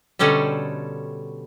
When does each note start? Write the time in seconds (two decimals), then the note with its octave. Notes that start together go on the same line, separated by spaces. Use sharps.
0.19 B2 D3 G3 C#4 A4 C5